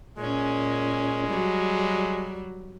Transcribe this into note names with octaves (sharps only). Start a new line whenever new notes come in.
A#2 G#3 C#4
F#3 G3